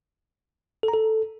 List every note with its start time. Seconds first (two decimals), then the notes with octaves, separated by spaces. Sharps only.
0.83 A4
0.88 A#5
0.93 A4